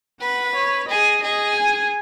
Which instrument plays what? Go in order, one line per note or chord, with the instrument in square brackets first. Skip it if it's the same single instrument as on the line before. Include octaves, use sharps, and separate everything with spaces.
[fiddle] B4 [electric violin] F#5
[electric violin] C#5
[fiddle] G#4 [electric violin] D#5
[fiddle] G#4 [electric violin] D#5
[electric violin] G#5